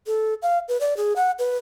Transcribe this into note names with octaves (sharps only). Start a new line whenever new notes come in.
A4
F5
B4
D5
G#4
F#5
B4